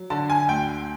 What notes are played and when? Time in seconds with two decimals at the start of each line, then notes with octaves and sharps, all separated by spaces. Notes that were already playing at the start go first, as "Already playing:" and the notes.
Already playing: F#3
0.10 D3 A5
0.30 G#5
0.48 D2 G5